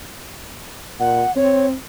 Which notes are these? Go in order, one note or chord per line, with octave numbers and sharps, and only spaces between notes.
A#2 F#5
C4 C#5